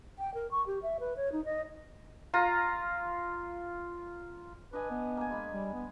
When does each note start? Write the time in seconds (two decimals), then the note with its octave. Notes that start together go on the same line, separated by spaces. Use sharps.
0.19 G5
0.34 A#4
0.51 C#6
0.67 G4
0.82 E5
1.00 B4
1.17 C#5
1.32 D#4
1.45 D#5
2.34 F4 A#5
4.73 D4 B4 D#5 G#5
4.91 B3
5.17 A#3 G#5
5.30 G#3 B5
5.53 G3
5.73 B3